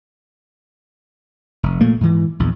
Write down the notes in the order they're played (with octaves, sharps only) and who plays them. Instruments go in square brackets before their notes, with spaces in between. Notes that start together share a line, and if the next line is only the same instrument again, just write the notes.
[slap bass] F1
A#2 A3 A#3
G#2 E3
A#1 E2